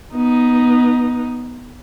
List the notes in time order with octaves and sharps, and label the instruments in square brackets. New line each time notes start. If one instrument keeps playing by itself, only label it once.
[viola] B3 D#4